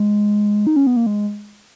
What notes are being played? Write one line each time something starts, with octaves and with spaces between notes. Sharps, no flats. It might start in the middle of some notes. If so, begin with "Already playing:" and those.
Already playing: G#3
D#4
C#4
B3
A#3
G#3